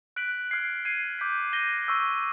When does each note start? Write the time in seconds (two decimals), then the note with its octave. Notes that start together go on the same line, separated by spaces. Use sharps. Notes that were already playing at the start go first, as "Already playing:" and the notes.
0.16 F#6 B6 D7 F#7
0.51 F6 G#6 C7
0.85 G#6 C7 D#7
1.19 D6 G6 B6
1.53 G6 A#6 D#7 G7
1.87 C#6 E6 G6